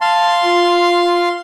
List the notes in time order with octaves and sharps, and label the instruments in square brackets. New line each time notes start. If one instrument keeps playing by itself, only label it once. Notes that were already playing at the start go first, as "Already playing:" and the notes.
[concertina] F5 C6 [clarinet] A5
[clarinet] F4